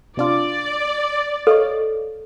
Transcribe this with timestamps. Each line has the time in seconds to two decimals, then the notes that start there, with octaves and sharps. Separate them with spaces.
0.17 C3 D4 F4 D5
1.47 A4 C#5 D#5 F5